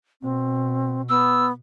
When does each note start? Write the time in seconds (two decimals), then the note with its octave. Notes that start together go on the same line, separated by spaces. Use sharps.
0.22 B2 C4
1.09 B3 E6